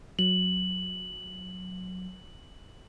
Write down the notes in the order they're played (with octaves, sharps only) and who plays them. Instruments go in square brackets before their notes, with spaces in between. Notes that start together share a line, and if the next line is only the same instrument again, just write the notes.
[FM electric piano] F#3 [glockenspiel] F#7